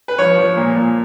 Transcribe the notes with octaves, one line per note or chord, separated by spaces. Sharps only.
B4
F3 C#5
F3
A#2
A#2